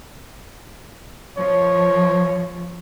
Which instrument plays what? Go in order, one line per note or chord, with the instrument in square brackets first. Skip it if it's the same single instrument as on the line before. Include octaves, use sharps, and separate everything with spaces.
[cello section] F3 [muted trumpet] C#5